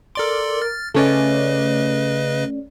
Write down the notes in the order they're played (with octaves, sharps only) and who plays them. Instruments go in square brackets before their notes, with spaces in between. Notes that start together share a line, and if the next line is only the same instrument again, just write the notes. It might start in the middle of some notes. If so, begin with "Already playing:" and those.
[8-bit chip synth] A4 D5 C6 [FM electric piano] A#4 D6
[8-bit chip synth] F6 A6
[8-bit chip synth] C#3 B4 D#5 [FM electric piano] A3 C#4 D5